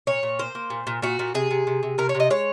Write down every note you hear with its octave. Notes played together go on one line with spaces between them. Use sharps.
A#2 C#5
A#2
A#3 C5
A#3
A#2
A#2
A#2 F#4
A#2
C3 G#4
C3
C3
C3
C3 A#4
C#5
C3
D#5
G#3 C#5